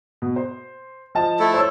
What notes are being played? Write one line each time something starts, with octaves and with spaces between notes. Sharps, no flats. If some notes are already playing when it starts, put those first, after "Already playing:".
B2
C5
F3 D#5 A5
A3 E4 A4
C5 C#5 E6